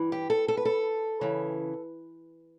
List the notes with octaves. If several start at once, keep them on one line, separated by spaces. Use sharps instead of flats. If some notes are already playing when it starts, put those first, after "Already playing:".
Already playing: G2 E3
G4
A4
A4
B4
A4
C#3 E3